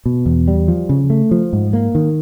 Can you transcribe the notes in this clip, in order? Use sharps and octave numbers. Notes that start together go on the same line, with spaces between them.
B2
E2
G3
F3
C#3
A3
F3
G#2
A#3
D#3